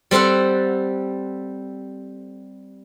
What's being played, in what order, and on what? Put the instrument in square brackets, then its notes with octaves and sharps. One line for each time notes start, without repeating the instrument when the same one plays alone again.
[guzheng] G3 C4 A4 C5 F#5